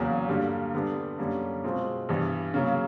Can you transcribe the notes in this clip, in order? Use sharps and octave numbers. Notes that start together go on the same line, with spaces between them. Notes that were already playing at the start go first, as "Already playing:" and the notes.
Already playing: E2 C#3 F#3 A#3
G2 D3 G3 A#3
D3 G3 B3 D4 G4
F#2 D3 G3 A#3 C#4
B2 G#3 C4 F4
G2 E3 G3 B3
C#3 F#3 A#3